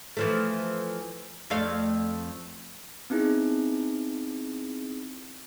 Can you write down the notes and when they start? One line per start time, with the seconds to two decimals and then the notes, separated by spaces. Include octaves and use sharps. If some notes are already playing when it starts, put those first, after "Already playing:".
0.17 E3 F3 A3
1.50 F2 A3 F5
3.10 B3 C4 D#4 E4 G#4